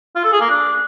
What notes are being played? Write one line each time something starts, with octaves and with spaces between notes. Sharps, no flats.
F4
A4
G#4
A#3
D4